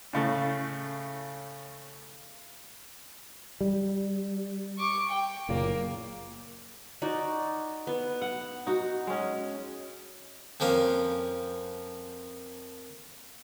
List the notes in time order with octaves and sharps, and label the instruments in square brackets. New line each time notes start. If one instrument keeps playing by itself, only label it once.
[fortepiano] A2 C#3 A3
[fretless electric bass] G3
[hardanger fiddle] C#6 D6
G5
[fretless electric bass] F#1 A#2 C#3 [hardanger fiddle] A#3
[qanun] D#4 F#4 D5
B3
[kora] F#5
D#4 F#4
G#3 C#4
[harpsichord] F2 F3 A#3 C#4